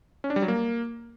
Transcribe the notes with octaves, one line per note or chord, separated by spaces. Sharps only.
C#4
D4
G3
F#3
A#3